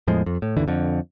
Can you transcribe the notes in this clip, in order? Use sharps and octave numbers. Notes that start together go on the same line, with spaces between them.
E2 A2 F3 G#3
F2
A2
G1 D#2 D3 E3
F2 D3